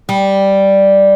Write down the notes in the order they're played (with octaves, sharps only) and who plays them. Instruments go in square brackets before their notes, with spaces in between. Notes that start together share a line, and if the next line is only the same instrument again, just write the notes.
[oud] G3